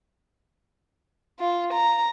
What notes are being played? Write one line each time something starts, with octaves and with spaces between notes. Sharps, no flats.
F4
A#5